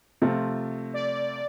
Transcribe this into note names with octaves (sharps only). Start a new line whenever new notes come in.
C3 F3 A3 C4 F4
D5